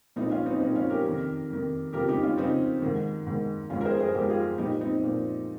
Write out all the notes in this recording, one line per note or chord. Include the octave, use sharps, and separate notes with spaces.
A#2 F3 C4 D#4
C#4 F4
C4 D#4
A#2 F3 C4 D#4
C#4 F4
G4 A#4
F2 D#3
F2 D#3
F2 C#3 F3 G4 A#4
D#4 G4
C#4 F4
F2 C#3 F3 C4 D#4
G#2 D#3
G#2 D#3
G#2 F3 C#4 F4
A#4
G#4 C5
G#4 C5
G#2 F3 G4 A#4
F4 G#4
A#2 F3 D#4 G4
C4 D#4
A#2 F3